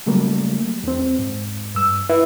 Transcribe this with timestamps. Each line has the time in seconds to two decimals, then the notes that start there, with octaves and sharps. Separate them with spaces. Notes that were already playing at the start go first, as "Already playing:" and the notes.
0.06 C#3 F#3 G3 A3 A#3
0.83 E2 C4
1.19 G#2
1.75 G2 E6
2.10 E4 B4 E5